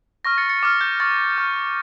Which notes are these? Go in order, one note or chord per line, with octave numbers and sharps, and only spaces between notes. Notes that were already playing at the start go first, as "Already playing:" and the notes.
C#6 F6 A#6
A6 C#7
A6 C#7
D6 F6 A6
G6
C#6 F6 A6
C#6 F6